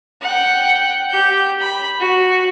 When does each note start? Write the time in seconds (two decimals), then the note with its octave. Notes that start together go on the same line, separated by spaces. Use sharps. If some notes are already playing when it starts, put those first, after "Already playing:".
0.22 F#5 G5
1.10 G4 G6
1.60 B5
2.01 F#4